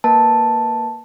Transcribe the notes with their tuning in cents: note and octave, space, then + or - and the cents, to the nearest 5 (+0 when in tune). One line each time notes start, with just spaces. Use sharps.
A#3 +0 B4 +0 A5 +0